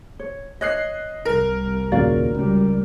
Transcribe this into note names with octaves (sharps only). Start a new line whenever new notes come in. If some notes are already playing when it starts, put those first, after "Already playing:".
C#5
C#5 D#5 F#6 C7
C2 A#4
D#2 A#2 C#3 F#4 D5 F5
C#2 G3